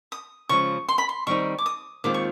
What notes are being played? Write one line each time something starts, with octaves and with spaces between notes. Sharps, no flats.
D#6
C#3 F3 G#3 C#6
C6
B5
C6
D#3 G3 C4 D#4 C#6
D6
D#6
D#2 D#3 G#3 C4 F4 D6
C#6